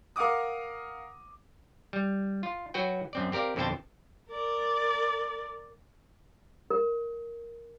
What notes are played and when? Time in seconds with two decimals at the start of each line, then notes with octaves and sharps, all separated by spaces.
0.16 A#4 F5 F#5 D6 D#6
1.93 G3
2.43 F4
2.74 F#3 F#4 B4 G5
3.13 F#2 C4 D5
3.32 C4 G4 A#4 D5 F5
3.56 F2 B2 D3 C5 G5 A5
4.29 A#4 D5
6.70 A#4